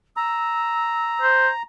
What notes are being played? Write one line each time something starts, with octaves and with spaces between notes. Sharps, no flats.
A#5 E6
C5